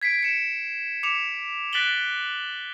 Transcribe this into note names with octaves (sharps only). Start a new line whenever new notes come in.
G#6 B6 C7 D7
C#7 E7
D6 C#7 E7 F7
F#6 A6 B6 D7 F#7 G7